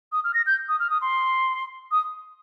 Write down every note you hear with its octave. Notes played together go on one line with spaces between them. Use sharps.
D#6
F6
A#6
G6
D#6
F6
D#6
C6
D#6